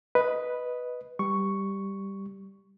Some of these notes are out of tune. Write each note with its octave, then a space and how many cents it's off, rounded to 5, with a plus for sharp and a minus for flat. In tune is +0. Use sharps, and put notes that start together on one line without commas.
B4 +0 D#5 +0
G3 +0 C#6 +5